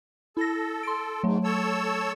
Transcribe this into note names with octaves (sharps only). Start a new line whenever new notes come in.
E4 A4 A#6
C6 D7
G#2 F#3 A3
A4 C#5 E6